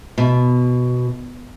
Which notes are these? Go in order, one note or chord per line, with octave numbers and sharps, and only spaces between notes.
B2